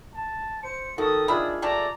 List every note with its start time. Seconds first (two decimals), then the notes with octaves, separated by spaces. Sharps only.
0.14 A5
0.63 C5 C#7
0.98 D#3 F#4 A4 D#6
1.28 D#3 D4 F4 G#4 E5 B5
1.62 A3 G4 D5 A5 A#5